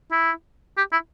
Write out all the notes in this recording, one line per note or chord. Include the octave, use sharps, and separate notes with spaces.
E4
G4
E4